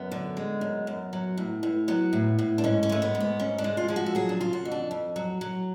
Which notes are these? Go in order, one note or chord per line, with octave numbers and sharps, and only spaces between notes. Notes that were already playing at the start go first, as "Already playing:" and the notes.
Already playing: F#2 B3
D3
G#3
F#2
F#2
F#3
A2
A2
F#3 B3
A2
A2
D4
G#2 C#4
C#4
G#3 A3
B3
G#2
B3
G#2 C#4
D4
G#3
F4
F3 G#4
F#4
A4
F#3 G#4
D4
C#3 F4
F#4
F2
D4
F2
F#3
F#3